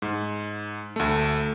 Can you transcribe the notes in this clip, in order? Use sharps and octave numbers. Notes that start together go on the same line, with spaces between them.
G#2
D2 A3